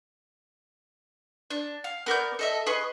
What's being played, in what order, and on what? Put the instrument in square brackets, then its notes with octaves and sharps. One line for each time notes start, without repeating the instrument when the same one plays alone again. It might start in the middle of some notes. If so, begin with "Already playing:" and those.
[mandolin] D4
F5
B3 A#4 D5 G6
A4 D#5 E5
G#4 B4 D#5 C#6